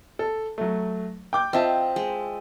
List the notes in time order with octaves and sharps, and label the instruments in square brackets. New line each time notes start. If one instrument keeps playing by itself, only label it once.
[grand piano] A4
F#3 A3
G5 D6 G6
[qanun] C4 F4 [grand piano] D#5 E5 A5
[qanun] G#3